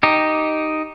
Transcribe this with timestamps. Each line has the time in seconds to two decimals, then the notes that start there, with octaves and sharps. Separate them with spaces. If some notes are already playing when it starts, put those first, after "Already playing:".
0.03 D#4 G4